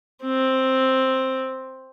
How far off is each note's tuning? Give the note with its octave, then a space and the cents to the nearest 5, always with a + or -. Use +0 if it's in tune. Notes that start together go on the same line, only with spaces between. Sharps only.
C4 +5